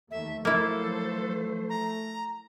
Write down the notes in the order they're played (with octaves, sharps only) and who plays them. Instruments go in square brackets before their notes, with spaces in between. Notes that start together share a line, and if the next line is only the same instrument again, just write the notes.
[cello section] D#2 [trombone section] A3 [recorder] E5
[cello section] F3 F#3 C5 [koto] A#3 E4 [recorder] A4
[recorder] A#5